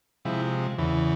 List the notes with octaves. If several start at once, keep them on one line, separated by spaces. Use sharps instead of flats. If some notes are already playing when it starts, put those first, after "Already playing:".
C3 F3 G#3 E4
E2 C#3 E3